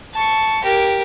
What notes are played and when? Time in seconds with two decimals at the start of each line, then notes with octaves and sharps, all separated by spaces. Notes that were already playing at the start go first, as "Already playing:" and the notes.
0.13 A5 C#6
0.63 G4 A#4